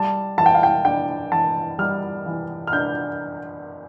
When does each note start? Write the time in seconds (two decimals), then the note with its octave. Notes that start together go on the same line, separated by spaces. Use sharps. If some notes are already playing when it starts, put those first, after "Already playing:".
Already playing: G3 A5
0.38 E3 A5
0.46 G5
0.55 F5
0.63 G5
0.85 D4 G5
1.32 E3 A5
1.79 G3 F6
2.26 E3
2.67 F6
2.73 D4 G6